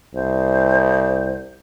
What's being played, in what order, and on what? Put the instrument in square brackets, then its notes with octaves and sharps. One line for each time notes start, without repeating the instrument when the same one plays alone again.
[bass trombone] C2 [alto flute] C5